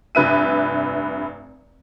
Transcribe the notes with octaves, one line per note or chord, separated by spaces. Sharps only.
F1 G2 B4 E5 D#7